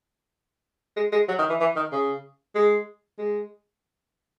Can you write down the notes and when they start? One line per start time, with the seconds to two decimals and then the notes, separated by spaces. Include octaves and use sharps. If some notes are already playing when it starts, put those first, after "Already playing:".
0.97 G#3
1.12 G#3
1.28 F#3
1.39 D#3
1.50 E3
1.60 E3
1.76 D#3
1.92 C#3
2.55 G#3
3.19 G#3